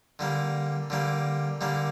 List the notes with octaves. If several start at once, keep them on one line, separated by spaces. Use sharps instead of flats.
D3 G3 A#3
D3 G3 A#3
D3 G3 A#3